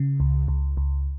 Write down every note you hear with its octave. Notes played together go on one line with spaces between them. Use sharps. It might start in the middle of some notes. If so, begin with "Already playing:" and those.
Already playing: C#3
C#2
C#2
C#2